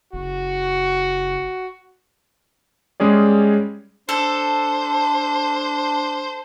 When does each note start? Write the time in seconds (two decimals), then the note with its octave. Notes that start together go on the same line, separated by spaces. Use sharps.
0.13 F#1 F#4
3.00 G3 G#3 C#4 G#4 D5
4.09 D4 A4 C5